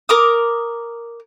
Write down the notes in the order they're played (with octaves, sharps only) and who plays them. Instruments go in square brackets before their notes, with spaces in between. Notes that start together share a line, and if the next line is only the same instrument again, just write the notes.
[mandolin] A#4 A#5 D6 D#6